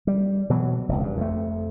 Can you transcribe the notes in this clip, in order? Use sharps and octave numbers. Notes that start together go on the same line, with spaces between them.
G3
B2 E3 F#3
F1 C#2
G2
F2 A3